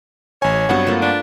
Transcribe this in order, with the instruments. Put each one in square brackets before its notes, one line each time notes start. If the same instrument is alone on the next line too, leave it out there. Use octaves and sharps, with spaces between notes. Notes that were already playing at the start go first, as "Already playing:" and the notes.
[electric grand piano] A1 G#5 [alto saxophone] C#5
[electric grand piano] G2 F#5 [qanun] F#3 B3 C4
[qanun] A3 A#3 F4
[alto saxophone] D4 [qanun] B4